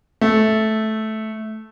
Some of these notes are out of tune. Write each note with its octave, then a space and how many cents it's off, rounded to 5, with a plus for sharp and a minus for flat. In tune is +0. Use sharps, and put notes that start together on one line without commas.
A3 -10